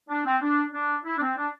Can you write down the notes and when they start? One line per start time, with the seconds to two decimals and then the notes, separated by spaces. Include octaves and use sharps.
0.10 D4
0.25 C4
0.42 D4
0.74 D4
1.05 E4
1.18 D4
1.21 C4
1.37 D4